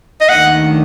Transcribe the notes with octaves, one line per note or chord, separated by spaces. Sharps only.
D#5
D#2 D#3 A3 D4 F#5